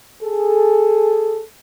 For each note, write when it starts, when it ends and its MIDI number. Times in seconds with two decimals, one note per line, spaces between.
0.22 1.41 68
0.22 1.41 69